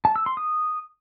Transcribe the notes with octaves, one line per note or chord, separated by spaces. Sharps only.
A5
E6
C6
D#6